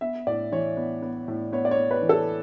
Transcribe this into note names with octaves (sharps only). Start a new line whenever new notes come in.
B3 E5
A2 D5
E3 C#5
B3
B3
A2
B3 C#5
D5
C#5
B3
B4
E3
A4